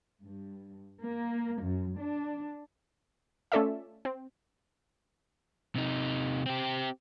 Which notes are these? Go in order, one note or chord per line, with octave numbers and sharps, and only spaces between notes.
G2
A#3
F#2
D4
A3 C#4 F4 A4 D5 E5
C4
C3 D#4
C4 G4